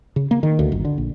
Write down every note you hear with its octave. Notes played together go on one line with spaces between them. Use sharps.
C#3
A#3
D#3
D2
G1
D3
A#1